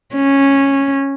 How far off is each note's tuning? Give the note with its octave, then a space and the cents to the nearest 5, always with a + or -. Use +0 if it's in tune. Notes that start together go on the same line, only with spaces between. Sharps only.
C#4 -10